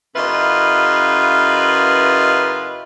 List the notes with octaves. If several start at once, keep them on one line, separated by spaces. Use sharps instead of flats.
F#2 C#3 E4 F4 B4 D#5